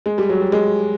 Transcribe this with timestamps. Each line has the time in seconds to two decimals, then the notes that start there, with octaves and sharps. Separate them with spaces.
0.06 G#3
0.18 G3
0.29 F#3
0.41 G3
0.52 G#3